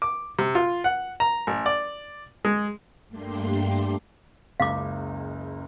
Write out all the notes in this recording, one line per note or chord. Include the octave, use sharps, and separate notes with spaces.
D6
C3
F4
F#5
A#5
A1
D5
G#3
G2 A3 A#3 D4 G4 C6
F#1 C#2 F5 D6